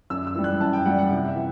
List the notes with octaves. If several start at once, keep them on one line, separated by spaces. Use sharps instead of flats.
F#2 E6
E6
E3 G3
F#6
F#2 A5
G5
E3 G3 F#5
F#5
C3 G5
E5
E3